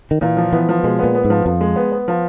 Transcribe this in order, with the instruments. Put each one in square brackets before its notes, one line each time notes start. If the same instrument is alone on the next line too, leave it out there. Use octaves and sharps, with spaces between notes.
[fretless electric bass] D#3
[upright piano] A#2 [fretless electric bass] E3
[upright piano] F3
[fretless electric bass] E3 [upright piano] B3
[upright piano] F3
[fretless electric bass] B2 [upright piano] G#3
[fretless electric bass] A#2 [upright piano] B3
[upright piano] B3
[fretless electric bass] G#2
[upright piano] F3
[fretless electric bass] F2 [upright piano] F3
[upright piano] G#3
B3
B3
F3